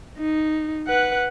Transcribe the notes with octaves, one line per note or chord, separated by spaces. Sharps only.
D#4
B4 F#5